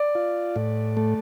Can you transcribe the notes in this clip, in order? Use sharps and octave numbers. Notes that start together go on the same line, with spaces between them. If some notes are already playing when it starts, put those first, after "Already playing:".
Already playing: D5
F4
A2
A3